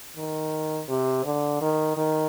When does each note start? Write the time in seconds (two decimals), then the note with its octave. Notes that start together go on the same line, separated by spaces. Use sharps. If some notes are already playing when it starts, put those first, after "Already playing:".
0.17 D#3
0.89 C3
1.25 D3
1.61 D#3
1.97 D#3